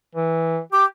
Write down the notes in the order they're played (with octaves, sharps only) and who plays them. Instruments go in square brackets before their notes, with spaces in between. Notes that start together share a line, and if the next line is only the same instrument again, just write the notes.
[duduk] E3
[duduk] G4 [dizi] D6